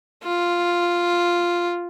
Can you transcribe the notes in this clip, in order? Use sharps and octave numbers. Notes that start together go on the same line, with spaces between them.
F4